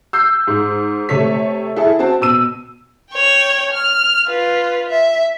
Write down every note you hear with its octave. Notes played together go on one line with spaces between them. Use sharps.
E6 G6 C7
G#2
C3 A3 A4 C#5 B6
E4 G#4 A4
C4 F#4 A5
B2 E6 D#7
C#5 G5
F6
F4 B4
E5